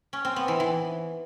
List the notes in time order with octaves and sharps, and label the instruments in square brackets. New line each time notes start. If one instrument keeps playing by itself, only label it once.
[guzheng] C#4
C4
B3
E3
E3